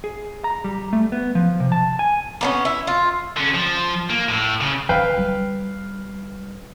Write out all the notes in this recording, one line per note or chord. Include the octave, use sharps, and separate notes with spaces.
G#4
A#5
G3
A3
B3
F3
C3
A5
G#5
A#3 B3 C#4
E4
F4
D3 C#4
F3
A#3
A2
C#3
D#3 B4 F5 G5
G3